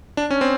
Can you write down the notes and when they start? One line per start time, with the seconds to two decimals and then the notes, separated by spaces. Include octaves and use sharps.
0.17 D4
0.31 C#4
0.41 C4